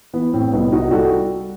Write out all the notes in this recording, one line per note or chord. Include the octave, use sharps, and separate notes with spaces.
E3 B3
A2 C4
C2 B3 D#4
C2 D#4 F#4
G3 F#4 A4